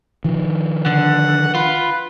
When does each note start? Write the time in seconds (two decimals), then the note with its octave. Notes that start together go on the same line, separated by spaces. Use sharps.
0.25 D#3 F3
0.86 D3 F#5
1.55 F4 B4